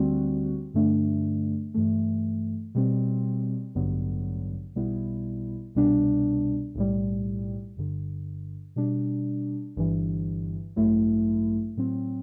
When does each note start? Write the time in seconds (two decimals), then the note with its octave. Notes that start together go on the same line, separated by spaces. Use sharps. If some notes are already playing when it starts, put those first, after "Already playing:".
Already playing: D2 D3 G3 C4 F#4
0.74 G2 D3 A3 D4
1.74 G2 E3 A3
2.75 B2 G3 C4
3.75 A1 G2 D3 F#3 B3
4.75 B1 B2 G3 B3 E4
5.75 C2 B2 G3 B3 D4
6.75 B1 A2 G3
7.76 G1 G2 D3
8.76 B2 G3 D4
9.77 G1 G2 E3
10.76 A1 G2 F#3 A3 E4
11.77 A2 F#3 C4